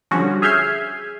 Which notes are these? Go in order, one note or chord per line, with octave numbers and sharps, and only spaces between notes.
D3 F3 G3 C#4 F#4
G#4 E5 F6 G6 G#6 C7